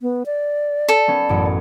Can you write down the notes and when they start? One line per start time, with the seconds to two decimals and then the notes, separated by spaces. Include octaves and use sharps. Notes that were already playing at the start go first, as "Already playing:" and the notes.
0.02 B3
0.26 D5
0.88 A4
1.08 B3 C#4
1.29 A1 F#2 C#7